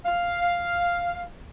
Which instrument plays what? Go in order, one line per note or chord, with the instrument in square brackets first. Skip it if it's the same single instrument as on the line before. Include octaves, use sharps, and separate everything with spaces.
[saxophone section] F5